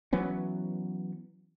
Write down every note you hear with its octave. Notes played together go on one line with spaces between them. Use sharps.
E3 F#3 B3 C#4